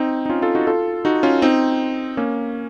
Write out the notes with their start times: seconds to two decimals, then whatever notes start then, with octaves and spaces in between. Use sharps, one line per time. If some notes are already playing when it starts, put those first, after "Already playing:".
Already playing: C4 D#4
0.26 D#4
0.29 C#4 F4
0.42 F4 A4
0.55 D#4 F#4
0.67 F4 A4
1.05 D#4 F#4
1.23 C#4 F4
1.42 C4 D#4
2.17 A#3 C#4